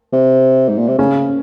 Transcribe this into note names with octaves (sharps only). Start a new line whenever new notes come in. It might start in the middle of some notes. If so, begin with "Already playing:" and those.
C3
G#2
A#2
C3
C#3 C#4